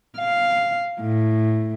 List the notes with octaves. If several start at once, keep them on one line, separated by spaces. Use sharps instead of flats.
F5
A2